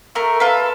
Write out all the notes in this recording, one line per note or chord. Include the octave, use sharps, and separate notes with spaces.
A3 A#4
F4 A4 B4